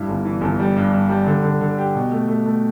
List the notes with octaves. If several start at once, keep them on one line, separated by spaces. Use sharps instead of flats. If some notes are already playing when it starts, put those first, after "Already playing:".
Already playing: G2 E4
G1
E3
G1
G3
G2
G2
G3
D3
D3
D3
G4
B2
A3
A3
A3